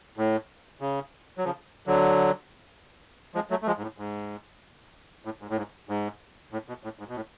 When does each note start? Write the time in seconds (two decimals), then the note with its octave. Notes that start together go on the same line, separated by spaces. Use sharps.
0.17 A2
0.81 C#3
1.38 F#3
1.44 C#3 F3
1.87 D3 F#3
3.35 F3 G#3
3.50 F#3 A3
3.62 A3
3.67 F3 G#3
3.78 G#2
3.82 A2
3.98 G#2
5.25 A2
5.42 G#2
5.50 A2
5.58 G#2
5.89 G#2
6.53 A2
6.68 B2
6.84 A2
6.99 G#2
7.09 B2
7.16 A2